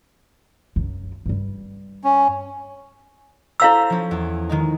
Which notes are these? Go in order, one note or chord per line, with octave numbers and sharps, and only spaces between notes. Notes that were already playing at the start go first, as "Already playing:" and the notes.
F#2
G2 G3
C#4
E4 A4 C5 F5 A#5 E6
F3 C#4
E2
D#3 G#3 D#4